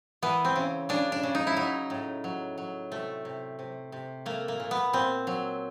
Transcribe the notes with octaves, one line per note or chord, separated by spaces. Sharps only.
E3 B3
C4
C#3
C#3 D4
D4
C#3
D#4
E4
F#3 D#4
A2
F#3
F#3
C3 A3
C3
C3
C3
A3 A#3
A#3
A#2
B3
A#2 C4
F#3